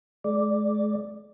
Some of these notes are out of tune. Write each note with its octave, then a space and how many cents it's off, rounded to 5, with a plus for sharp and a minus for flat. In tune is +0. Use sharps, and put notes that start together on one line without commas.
G#3 +40 D5 +0